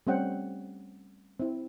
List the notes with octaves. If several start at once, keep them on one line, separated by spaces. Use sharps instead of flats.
G3 A3 C4 C#4 F#5 G5
C4 E4